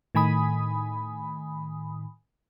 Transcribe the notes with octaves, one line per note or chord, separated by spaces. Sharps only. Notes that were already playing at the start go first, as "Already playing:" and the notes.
A2 D#3 G#5 B5 D#6